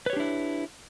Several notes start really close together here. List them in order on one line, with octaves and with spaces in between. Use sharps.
B4 C#5 G4 D4 E4